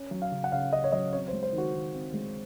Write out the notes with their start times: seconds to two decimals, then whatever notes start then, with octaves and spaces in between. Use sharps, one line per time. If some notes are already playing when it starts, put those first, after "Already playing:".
Already playing: C#4
0.11 F#3
0.22 F5
0.32 C#3
0.44 F#5
0.52 C#3 F5
0.72 C#4 D#5
0.84 C#5
0.92 F#3 D#5
1.13 C4 C#5
1.28 C5
1.33 G#3
1.43 C5
1.53 D#3
1.58 F#4
1.74 D#3
1.94 C4
2.14 G#3